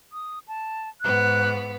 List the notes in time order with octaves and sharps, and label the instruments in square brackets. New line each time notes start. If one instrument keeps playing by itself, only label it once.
[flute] D#6
A5
[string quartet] G#2 B3 [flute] F#6